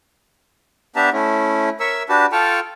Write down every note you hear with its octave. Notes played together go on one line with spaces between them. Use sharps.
B3 D4 G4 E5 A5 A#5
A3 C#4 E4
A#4 C#5 E5 C#6 E6
D4 F#4 G4 B4 A5
F4 A4 G5 A5 C#6 F6